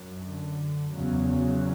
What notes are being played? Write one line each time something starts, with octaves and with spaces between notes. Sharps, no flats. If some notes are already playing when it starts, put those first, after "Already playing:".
Already playing: F#2
D3
E2 C#3 F#3
F#3